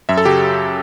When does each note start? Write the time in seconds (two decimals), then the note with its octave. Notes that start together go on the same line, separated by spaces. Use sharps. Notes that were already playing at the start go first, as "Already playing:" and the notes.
0.09 F#2 E5
0.17 A4
0.25 C#3 F#3 G4